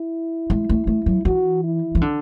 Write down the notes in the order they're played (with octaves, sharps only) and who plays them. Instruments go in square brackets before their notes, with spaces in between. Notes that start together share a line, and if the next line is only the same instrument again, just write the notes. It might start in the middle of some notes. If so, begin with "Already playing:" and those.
Already playing: [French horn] E4
[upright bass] G#3
A3
A3
F#3
[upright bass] E3 [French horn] F#4
[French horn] E4
[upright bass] E3
D3